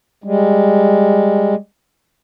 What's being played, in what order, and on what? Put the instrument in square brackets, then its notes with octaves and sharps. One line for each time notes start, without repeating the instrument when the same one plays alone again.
[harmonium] G3 G#3